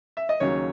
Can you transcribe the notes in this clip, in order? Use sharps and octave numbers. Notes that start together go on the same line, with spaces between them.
E5
D#5
D#2 C#3 F#3 C#5